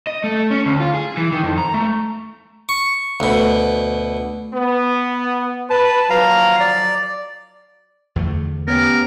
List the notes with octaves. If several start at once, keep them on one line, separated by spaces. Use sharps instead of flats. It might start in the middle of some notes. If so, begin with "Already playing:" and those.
D#5
A3
C#4
D2
F4
G#4
E3
D#3
F2
A#5
A3
C#6
D2 B2
B3
B4 A5
D#3 F3 F#3 F5 A#5
D5
E2 D3 A3
B3 C#4 G4 A#4